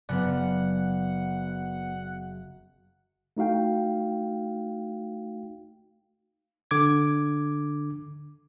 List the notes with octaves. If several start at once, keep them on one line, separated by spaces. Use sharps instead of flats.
F#1 B3 D5 F#5
A3 D#4 F#4 F5 G5
D3 D6 G#6